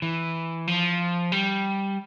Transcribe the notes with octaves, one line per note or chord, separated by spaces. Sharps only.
E3
F3
G3